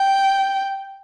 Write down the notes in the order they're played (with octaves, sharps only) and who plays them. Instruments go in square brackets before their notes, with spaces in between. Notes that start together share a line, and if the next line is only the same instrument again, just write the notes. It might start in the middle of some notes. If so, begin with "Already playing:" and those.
Already playing: [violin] G5